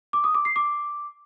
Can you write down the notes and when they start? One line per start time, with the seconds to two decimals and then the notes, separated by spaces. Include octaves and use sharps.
0.13 D6
0.24 D#6
0.35 D6
0.45 C7
0.56 D6